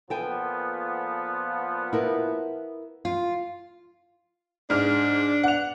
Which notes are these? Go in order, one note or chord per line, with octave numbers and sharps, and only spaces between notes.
A#2 F3 B3 A4 G5 G#5
E4 A#4 B4
F4
G#2 D4 F6
F#5 F7